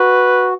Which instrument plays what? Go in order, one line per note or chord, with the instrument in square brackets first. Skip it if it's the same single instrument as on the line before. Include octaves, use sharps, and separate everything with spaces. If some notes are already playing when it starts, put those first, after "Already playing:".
Already playing: [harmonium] F#4 [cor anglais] B4